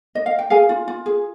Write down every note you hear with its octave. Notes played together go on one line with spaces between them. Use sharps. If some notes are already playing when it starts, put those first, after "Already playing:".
D#5
F5
G5
G#4 F5 G#5
F4
F4
G#4